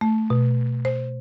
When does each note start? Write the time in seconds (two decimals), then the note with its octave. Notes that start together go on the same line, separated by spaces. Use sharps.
0.01 A3
0.30 B2
0.85 C5